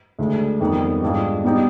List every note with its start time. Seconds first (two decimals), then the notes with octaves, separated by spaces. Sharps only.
0.19 D2 D3 G#3
0.60 F2 D#3 G3 B3 D#4
1.02 G#2 G3 D4 F4 G#4
1.44 B2 G3 B3 D#4 G4